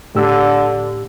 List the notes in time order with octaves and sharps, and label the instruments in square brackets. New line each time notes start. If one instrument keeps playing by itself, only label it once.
[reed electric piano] A2 G4 E6 [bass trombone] D3